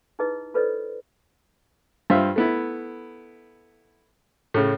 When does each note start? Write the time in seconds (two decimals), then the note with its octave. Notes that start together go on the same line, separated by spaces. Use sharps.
0.19 D#4 E4 G#4 B4 D#5
0.54 F4 A4 B4 C5 D5 D#5
2.10 G2 F4 C5 E5
2.36 A3 B3 E4
4.54 A2 C#3